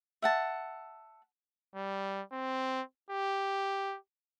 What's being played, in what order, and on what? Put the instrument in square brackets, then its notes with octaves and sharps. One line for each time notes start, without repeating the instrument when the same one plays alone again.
[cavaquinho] E5 F#5 A5
[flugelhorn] G3
C4
G4